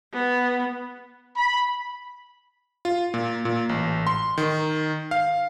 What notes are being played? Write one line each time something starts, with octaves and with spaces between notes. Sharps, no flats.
B3
B5
F4
A#2
A#2
A1
C6
D#3
F5